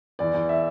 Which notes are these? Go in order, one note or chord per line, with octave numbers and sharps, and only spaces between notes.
E2 D5
E2
E5